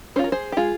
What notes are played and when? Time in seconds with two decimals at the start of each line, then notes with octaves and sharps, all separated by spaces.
0.16 C#4 C5
0.19 F4 A#4
0.32 G#4 C5
0.52 G4
0.57 G#3 F4 G#4